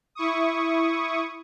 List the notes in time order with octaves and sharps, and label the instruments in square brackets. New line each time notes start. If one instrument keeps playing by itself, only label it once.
[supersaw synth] E4 C#6 D#6